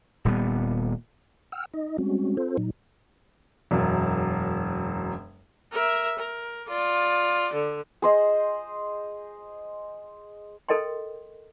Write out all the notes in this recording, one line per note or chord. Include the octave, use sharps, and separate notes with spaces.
D#1 A#2 G3 B3
F#5 G5 E6 F6
D#4 D#5
G3 G#3 C4 C#4 F#4
C4 F4 A4 C5
A#2 F#3 D#4
E1 F#2
A#4 E5
A#4
F4 D5
D3
G#4 C5 D#5
A4 A#4 D#5 G5 C6